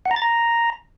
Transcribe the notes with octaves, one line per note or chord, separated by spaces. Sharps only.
F#5
A#5
A6
A#5